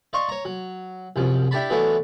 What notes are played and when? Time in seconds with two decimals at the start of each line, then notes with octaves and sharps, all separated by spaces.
0.13 D5 D#5 F5 C6 C#6
0.29 C#5 A#5
0.45 F#3
1.16 C2 F#2 F3
1.51 D4 E4 G4 D5 A5 B5
1.70 E3 F#3 A3 B3 D4 E4